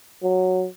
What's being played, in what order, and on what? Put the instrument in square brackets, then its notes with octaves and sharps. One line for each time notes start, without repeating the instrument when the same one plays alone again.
[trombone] F#3